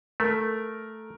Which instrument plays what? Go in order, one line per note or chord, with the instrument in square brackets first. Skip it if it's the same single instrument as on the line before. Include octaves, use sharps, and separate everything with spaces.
[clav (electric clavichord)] A3 [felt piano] A#4